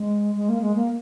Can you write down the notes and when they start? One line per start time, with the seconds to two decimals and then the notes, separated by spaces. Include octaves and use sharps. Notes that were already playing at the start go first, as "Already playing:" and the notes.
Already playing: G#3
0.35 G#3
0.48 A#3
0.61 G#3
0.75 A#3